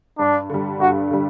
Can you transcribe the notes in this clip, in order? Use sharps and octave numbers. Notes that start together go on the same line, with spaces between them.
G2 D4
D3 G3
G2 F#4
D3 G3